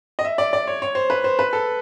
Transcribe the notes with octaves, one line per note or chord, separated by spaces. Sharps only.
D#5
E5
D5
D5
C#5
C#5
C5
B4
C5
B4
A4